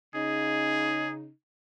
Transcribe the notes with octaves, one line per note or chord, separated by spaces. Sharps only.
C#3 D#4 G#4